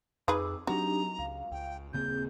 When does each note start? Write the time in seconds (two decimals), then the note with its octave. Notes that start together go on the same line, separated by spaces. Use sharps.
0.28 F2 D#4 G#4 B4 D6 E6
0.67 F#3 C4 D4 D#4 F#4 G4 A#5
1.19 C#2 F5
1.52 C#2 G5
1.93 D#1 C#3 A#3 C4 G#4 G6